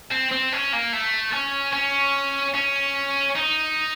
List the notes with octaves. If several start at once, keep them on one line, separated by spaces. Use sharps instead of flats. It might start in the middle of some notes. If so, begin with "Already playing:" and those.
C4
C4
C#4
A#3
A3
C#4
C#4
C#4
D#4